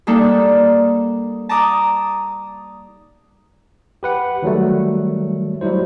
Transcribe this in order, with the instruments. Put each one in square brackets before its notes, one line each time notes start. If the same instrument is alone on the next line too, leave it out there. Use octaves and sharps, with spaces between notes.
[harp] G3 A#3 D4 D#4 A4
A5 A#5 D6 D#6
[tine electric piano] G4 B4 F#5
D#3 F#3 G3 A3
F#3 G3 E4 C5